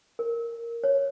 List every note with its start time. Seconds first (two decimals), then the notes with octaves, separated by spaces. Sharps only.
0.19 A#4
0.84 C#5